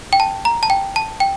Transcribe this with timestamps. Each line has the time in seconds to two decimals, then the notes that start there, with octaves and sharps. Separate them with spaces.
0.13 G5
0.20 A5
0.45 A#5
0.63 A5
0.70 G5
0.96 A5
1.20 G5